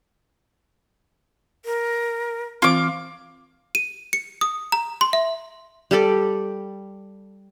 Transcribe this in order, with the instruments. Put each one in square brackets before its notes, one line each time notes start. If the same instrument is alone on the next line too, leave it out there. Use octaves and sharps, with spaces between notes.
[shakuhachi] A#4
[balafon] E3 C4 [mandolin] F4 D6
[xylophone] D#7
C#7
D#6
A#5
C6
E5
[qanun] G3 G4 A4 D5